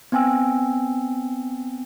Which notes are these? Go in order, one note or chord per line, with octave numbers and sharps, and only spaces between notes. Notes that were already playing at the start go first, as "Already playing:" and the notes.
B3 C4 G5 G#5 E6